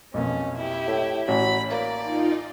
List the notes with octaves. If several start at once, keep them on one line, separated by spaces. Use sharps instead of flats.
B1 F2 A#3 C#4
E4 G4
A2
A1 F#3 B5
A#3 D5
D#4 F4